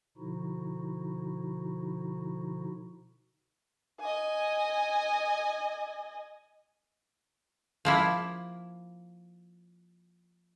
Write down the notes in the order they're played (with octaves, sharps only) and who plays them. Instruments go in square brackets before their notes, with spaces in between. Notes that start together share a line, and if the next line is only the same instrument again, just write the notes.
[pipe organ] B2 D3 F3 D#4 E4 F#4
[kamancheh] D#5 G#5
[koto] F3 A#3 E4